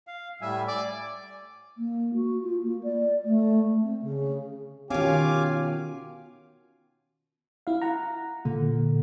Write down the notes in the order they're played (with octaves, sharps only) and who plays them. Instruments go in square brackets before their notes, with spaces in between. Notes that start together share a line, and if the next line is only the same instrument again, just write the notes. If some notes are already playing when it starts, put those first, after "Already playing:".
[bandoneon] F5
[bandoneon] A2 G3 G#5 [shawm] E5
[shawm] D5 [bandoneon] G#5
[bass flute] A#3
F#4
F4
A#3
D5
A3
C4
C#3
[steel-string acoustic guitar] B2 F4 [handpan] D#3 C#4 [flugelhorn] G4 [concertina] F5 G#5 D6
[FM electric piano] E4 F5
F#5 A#5
[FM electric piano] A#2 [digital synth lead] D3